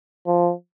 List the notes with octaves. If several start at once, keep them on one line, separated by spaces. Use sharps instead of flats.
F3